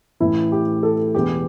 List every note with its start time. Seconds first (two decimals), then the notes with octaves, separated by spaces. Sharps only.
0.20 A1 A2 E3 E4
0.52 G4
0.83 A4
1.14 E1 E2 E3 G4